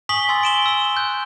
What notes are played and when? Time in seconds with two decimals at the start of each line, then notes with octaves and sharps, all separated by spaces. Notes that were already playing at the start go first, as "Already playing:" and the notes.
0.09 G#5 C#6 D#6 B6 F#7 G7
0.29 G#5 C6 E6 A6
0.43 D7 E7 G7
0.66 E6 G7
0.96 F#6 G6